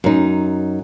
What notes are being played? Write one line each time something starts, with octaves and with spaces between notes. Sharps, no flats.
F#2 D#4